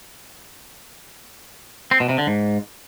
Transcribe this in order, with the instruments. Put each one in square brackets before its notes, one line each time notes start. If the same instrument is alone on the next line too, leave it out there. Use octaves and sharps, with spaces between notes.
[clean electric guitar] C4
B2
C3
D3
G#2